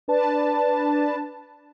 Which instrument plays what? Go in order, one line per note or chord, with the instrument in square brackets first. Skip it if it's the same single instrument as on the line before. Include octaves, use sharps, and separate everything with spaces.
[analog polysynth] D4 B4 A5